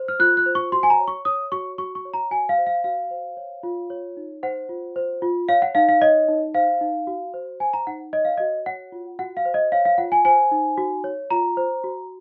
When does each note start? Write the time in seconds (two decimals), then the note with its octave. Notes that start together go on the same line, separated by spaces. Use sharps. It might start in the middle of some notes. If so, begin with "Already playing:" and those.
Already playing: C5
0.08 F6
0.20 F4 F#6
0.37 F#6
0.46 C5
0.55 C#6
0.72 F#4 C6
0.83 G#5
0.90 A#5
0.99 C#5
1.08 C#6
1.25 C#5 D#6
1.52 F#4 C#6
1.78 F#4 C#6
1.95 C#6
2.05 C#5
2.14 A#5
2.31 F#4 G#5
2.49 F5
2.58 C5
2.67 F5
2.84 F#4 F5
3.11 C5
3.37 C#5
3.63 F4
3.90 C#5
4.17 D#4
4.43 C5 F#5
4.69 F4
4.96 C5
5.22 F4
5.49 C#5 F5
5.62 F#5
5.75 D#4 F5
5.89 F5
6.02 C#5 D#5
6.28 D#4
6.54 C5 F5
6.81 D#4
7.07 F#4
7.34 C5
7.60 C5 G#5
7.73 A#5
7.87 D#4 F#5
8.13 C#5 D#5
8.25 F5
8.38 F#4 D#5
8.66 C#5 F#5
8.92 F4
9.19 F#4 F#5
9.37 F5
9.45 C5
9.54 D#5
9.72 C#5 F5
9.85 F5
9.98 F4 F#5
10.12 G#5
10.25 C5 G#5
10.51 D#4
10.78 F#4
11.04 C#5
11.30 F4 A#5
11.57 C5
11.84 F#4